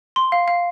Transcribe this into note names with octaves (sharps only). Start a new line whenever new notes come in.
C6
F5
F5